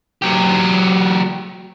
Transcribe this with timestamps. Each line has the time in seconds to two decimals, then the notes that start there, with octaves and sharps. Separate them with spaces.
0.22 F#3 G4